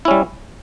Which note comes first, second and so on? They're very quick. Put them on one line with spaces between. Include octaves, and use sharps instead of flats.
E4 C#4 G3